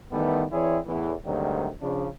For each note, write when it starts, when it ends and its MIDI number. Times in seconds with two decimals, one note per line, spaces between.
0.11 0.44 51
0.11 0.44 52
0.11 0.44 55
0.11 0.44 57
0.11 0.44 59
0.51 0.77 52
0.51 0.77 60
0.51 0.77 64
0.51 0.77 68
0.51 0.77 73
0.51 0.77 74
0.85 1.13 40
0.85 1.13 45
0.85 1.13 52
1.24 1.67 38
1.24 1.67 44
1.24 1.67 48
1.24 1.67 51
1.24 1.67 54
1.24 1.67 55
1.81 2.07 49
1.81 2.07 53
1.81 2.07 62